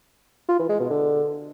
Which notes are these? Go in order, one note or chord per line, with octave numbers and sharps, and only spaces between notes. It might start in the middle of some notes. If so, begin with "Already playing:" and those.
F4
E3
G#3
B2
D3